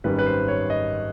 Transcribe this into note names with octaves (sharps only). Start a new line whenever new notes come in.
G#1 F#2 D#3 G3 B4
B4
C5
C#5
D#5